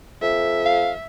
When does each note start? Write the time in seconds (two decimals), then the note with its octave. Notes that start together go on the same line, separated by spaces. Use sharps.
0.22 F2 E5
0.65 F5